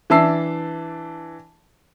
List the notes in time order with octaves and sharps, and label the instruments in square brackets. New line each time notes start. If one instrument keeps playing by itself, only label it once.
[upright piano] E3 D4 E5 A5 E6 C7